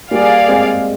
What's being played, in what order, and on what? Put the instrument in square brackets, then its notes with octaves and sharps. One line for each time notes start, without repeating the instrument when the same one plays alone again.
[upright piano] G3 A#3 [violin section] G#4 D5 F5
[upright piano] G#3 C4